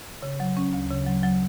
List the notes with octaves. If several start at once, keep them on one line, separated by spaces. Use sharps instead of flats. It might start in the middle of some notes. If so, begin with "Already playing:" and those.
C#3
F#3
C#4
D2
C#3
F#3
F#3